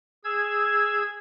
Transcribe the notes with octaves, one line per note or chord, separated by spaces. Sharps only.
G#4 E6 G#6